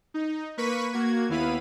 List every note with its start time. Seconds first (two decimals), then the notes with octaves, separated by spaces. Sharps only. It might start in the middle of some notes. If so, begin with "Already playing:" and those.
0.14 D#4
0.57 A#3 B4 C#6 B6 D#7
0.93 A#3 F#4 G#6
1.29 D#2 B3 E4 F5 B5 D#7